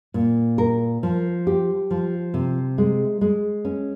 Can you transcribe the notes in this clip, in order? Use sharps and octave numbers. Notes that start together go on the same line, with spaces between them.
A#2
A#4
F3
G4
F3
C3
G#3
G#3
C#4